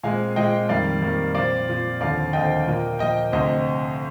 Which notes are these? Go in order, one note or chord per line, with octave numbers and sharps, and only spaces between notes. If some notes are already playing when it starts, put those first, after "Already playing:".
A#2 G#3 C4 F5 G#5
A#2 G#3 C4 D#5 G5
F2 D#3 G3 A#3 D5 F5
F2 D#3 G3 A#3
A#2 F3 C4 D5 F5
A#2 F3 C4
D#2 D3 F3 C4 D5 F5
D#2 D3 F3 C4 D#5 G5
A#2 F3 A#3
A#2 F3 A#3 D#5 G5
D2 C3 F3 C4 C5 D#5